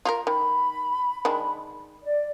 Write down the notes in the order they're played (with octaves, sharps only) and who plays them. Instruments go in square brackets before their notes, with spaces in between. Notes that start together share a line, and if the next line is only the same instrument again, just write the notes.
[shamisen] F4 G4 A#4
[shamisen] D#3 [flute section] B5
[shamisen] D#3 G#3 D4
[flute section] D5